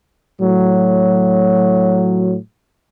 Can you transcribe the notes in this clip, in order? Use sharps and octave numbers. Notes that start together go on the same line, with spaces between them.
A2 F#3